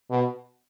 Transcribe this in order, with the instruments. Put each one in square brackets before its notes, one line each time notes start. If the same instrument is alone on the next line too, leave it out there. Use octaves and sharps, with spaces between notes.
[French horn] B2